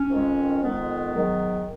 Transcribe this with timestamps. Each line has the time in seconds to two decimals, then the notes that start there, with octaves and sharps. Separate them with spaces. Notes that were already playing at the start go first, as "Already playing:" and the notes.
Already playing: C#4
0.10 F2 D#3 G#3
0.63 F2 D#3 G#3 B3
1.15 G#2 D#3 F#3